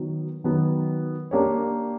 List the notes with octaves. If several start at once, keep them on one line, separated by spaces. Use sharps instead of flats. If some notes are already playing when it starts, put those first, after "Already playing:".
Already playing: D#3 F#3 B3
D#3 F#3 B3
A#3 D4 G4 A#4 C#5